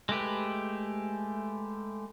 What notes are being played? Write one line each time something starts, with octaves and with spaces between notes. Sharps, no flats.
G#3 A3 G4 B4